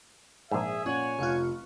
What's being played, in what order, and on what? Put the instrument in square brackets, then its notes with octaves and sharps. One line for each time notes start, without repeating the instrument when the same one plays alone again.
[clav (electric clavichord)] A#1 G#2 [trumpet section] G#4 E5
[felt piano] A#2 [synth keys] C#4 F#5 [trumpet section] C#5 G#5
[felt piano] F1 F5 F#6 [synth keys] F4 C#6